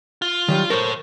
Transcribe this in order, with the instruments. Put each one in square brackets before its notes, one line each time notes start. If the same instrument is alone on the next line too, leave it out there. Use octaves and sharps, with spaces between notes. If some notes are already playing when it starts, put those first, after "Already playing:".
[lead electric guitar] F4
[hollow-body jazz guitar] D#3 F#3 G3
[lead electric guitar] A4 C#5 [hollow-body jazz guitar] A#4 C5